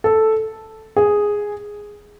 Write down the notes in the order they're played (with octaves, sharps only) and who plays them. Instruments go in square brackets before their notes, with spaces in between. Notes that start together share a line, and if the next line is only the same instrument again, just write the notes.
[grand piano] A4
G#4